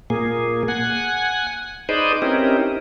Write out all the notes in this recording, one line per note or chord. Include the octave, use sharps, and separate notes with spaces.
A#2 A#3 G#4
F#5 G#5
D#4 G#4 B4 C5 D5 D#5
C4 C#4 D#4 E4 G4 A#4